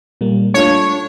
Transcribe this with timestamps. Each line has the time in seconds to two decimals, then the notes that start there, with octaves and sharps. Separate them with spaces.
0.21 A#2 G3 A#3
0.54 A3 D4 F4 C#5